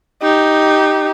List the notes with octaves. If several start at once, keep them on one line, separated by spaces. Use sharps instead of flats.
D#4 G4